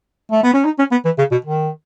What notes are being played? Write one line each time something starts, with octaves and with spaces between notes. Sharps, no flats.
A3
B3
C#4
D#4
C#4
B3
E3
C#3
B2
D#3